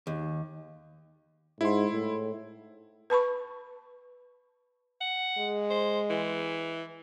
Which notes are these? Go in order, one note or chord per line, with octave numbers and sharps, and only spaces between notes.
D#2
G#2 E4 C6
A2
B4 A5 B5 C#6
F#5
G#3
C5
E3